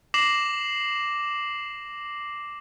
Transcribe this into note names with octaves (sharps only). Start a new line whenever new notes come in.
D6 A#6 C7 E7 F#7